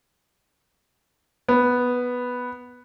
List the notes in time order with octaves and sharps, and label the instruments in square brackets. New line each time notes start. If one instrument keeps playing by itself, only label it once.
[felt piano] B3